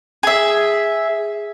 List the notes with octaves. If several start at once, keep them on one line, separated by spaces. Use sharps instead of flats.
G#4 E5